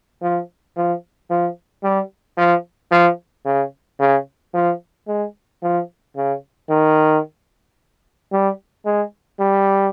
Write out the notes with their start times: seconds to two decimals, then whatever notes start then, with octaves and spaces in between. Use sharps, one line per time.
0.22 F3
0.76 F3
1.30 F3
1.83 G3
2.38 F3
2.91 F3
3.45 C#3
4.00 C#3
4.54 F3
5.08 G#3
5.62 F3
6.16 C#3
6.70 D#3
8.32 G3
8.85 G#3
9.40 G3